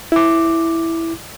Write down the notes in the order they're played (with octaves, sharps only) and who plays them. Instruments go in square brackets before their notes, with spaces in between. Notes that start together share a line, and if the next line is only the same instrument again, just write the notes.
[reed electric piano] E4 D6